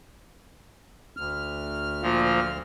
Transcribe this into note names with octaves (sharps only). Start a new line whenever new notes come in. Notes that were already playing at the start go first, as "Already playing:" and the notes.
D2 F6
A#2 F3